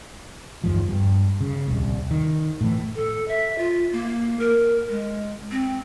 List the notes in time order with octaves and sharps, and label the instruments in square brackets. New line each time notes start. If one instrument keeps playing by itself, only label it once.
[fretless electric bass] G1 E2 G#2 F3
G2
C#3
D#1 C2
D#3
A2 E3
[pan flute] A4
E5
F4
A#3
A#4
G#3
C4